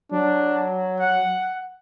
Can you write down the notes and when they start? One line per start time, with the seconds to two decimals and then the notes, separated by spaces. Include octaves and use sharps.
0.12 F#3 D4
0.99 F#5